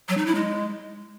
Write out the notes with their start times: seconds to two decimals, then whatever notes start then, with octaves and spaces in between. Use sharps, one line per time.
0.09 F#3
0.17 D#4
0.26 E4
0.35 G#3